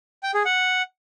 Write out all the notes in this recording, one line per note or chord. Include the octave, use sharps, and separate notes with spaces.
G5
G#4
F#5